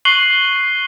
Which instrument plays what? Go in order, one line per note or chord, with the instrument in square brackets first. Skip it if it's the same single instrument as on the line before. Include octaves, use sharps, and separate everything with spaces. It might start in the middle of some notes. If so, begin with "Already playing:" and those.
[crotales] C#6 F#6 C7 D#7 F#7 G7